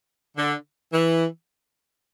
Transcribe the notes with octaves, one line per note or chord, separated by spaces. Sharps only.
D3
E3